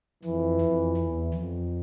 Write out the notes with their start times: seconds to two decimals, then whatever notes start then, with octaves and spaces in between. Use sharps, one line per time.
0.23 F2 E3
0.61 F2
0.97 E2
1.34 F2